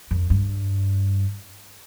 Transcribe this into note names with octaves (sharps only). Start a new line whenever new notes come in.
F2
G2